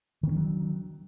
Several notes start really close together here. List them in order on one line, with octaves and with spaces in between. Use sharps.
D#3 B3 D4 F#3